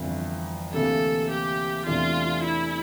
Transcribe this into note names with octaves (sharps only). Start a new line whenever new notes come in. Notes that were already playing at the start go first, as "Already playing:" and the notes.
Already playing: G1 F2 E3
D2 C3 E3 A#3 E4 A4
G4
E2 C3 E3 A3 D4 F4
E4